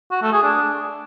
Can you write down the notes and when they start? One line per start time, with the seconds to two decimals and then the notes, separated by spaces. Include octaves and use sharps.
0.11 F#4
0.22 A3
0.32 G#4
0.43 D4